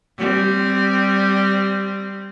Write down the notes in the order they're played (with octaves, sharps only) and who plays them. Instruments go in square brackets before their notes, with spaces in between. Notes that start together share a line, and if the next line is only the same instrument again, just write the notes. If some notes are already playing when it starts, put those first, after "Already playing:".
[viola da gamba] G3 C4